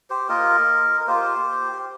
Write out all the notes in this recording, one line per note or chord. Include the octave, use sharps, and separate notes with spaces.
G4 C5
A#3 F4 A#4 D#5
A#4
A#3 F4 G4 C5
G4